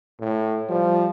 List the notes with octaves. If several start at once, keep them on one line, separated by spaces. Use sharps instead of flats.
A2
F3 G3